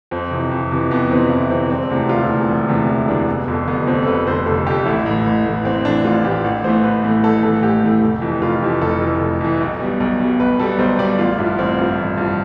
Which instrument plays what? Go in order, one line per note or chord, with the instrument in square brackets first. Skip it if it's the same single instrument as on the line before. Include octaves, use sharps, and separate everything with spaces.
[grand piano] F2 C4
C3 E3
F2
C3 E3
F2 B3
C3 E3 C4
F2 E4
C3 E3 C4
E1 C4
D2 C3 E3
E1 F4
D2 C3 E3
E1
D2 C3 E3
E1 E4
D2 C3 E3 D4
F1 B3
F2 D3
F1 B3
F2 D3 C4
A4
F1 B4
F2 D3 C5
F1 A4
F2 D3 G4
A1 E4
A2 E3
A1
A2 E3
A1 C4
A2 E3 D4
A1 F4
A2 E3 G4
A1
A2 E3 A3 C5
A1 B4
A2 E3 A3
A1 A4
A2 E3 A3 A4
A1 G4
A2 E3 A3
F1
F2 E3
F1 F4
F2 E3 G4
F1 A4
F2 E3
F1
F2 E3
B1
B2 G3
B1
B2 G3
B1 B4
B2 G3 A4
B1 C5
B2 G3 D5
A1 F4
G2 F3 E4
A1 C4
G2 F3
A1
G2 F3